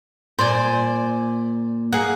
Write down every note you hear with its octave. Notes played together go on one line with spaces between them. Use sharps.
A#2 C5 D5 G#5
A#3 G#4 F#5